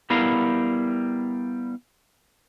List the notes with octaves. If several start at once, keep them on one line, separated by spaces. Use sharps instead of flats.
G3 B3 E4 A#4 F5